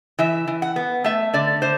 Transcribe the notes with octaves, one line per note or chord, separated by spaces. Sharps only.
E3 E5
E3
F#5
B3
A3 E5
D3 D5
D3 C5